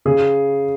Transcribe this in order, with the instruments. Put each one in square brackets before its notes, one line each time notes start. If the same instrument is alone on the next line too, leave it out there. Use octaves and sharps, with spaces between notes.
[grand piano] C#3 G#4